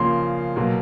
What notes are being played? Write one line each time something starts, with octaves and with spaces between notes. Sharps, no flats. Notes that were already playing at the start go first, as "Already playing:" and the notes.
Already playing: C#3 F3 A#3 C6
B2 F#3 A#3